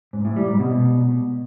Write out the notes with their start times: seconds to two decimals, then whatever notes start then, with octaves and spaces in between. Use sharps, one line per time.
0.13 G#2
0.25 A2
0.36 G3
0.48 G#2
0.60 B2